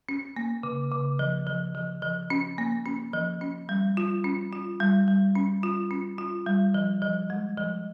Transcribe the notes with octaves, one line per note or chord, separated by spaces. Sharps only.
C#4
A#3
C#3
C#3
F3
F3
F3
F3
C#4
A#3
C#4
F3
C#4
G3
F4
C#4
F4
G3
G3
C#4
F4
C#4
F4
G3
F3
F3
G#3
F3